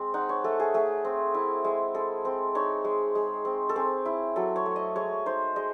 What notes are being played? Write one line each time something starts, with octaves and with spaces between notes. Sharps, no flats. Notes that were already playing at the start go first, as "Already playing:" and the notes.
Already playing: G#3 C4
D#4 F#5
C#5
A3 A4
G#4
A3 G#4
C4
E4
G#3
G#3 A4
C4
D#4 C#5
G#3
G#3
C4
A4
C4 G#4
E4
F#3 A4
C#5
A3
D#5
G#3 C#5
D#4 C5
G#3 D#5